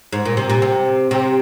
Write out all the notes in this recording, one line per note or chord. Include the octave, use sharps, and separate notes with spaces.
G#2
A#2
C3
A#2
C3
C3